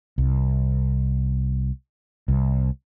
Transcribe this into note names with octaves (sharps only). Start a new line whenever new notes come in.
C2
C2